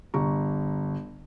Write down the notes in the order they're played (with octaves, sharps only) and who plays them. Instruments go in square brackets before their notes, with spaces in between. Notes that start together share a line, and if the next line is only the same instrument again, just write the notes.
[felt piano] G1 A#5 C#6